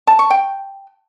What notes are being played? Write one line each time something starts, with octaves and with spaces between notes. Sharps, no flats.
A5
C#6
G5